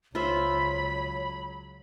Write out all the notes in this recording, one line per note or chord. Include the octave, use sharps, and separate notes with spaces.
C#2 F#3 F4 C5 C#5 E5 B5